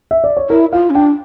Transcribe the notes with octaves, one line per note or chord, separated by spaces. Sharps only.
E5
D5
C#5
E4 A#4
F4 F5
C#4
D4 G5